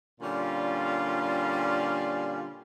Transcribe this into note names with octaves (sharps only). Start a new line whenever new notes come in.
A#2 D3 G3 C#4 F4